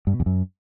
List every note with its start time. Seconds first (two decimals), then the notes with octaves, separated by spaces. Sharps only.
0.07 G2
0.13 B2
0.20 E2
0.26 F#2